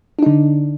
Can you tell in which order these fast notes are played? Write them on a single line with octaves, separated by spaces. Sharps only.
D4 D#4 D3